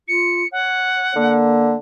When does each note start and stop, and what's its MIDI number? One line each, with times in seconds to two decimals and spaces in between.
0.08 0.42 65
0.08 0.47 97
0.52 1.11 73
0.52 1.35 78
1.16 1.76 50
1.16 1.75 58